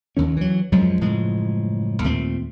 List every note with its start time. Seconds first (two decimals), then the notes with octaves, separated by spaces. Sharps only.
0.17 D#2 D#3 C#4
0.37 E3 F#3
0.72 F#2 F3 F#3 G#3
1.01 F#1 A2 F3 G#3
2.04 D#2 A#2 A3 C4